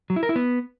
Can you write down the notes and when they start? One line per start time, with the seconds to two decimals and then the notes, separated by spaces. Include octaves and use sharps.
0.10 F#3
0.16 E4
0.23 A#4
0.29 E4
0.36 B3